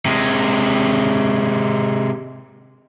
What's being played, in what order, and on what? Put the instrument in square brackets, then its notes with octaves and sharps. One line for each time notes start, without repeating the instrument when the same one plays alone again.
[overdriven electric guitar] C3 G#3